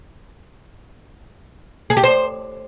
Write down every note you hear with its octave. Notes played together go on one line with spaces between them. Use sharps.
G#4
G4
C5